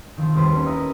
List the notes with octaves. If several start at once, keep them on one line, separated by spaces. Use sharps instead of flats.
D#3 F3 C4
D#2 G3 B4 C5 A5
A#3 C#4
E4 D#5 A#5 B5 D#6